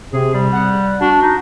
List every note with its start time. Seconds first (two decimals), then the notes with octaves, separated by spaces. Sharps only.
0.13 C3 G#4
0.34 G3
0.53 F#5
1.01 D4 F#4
1.22 D#4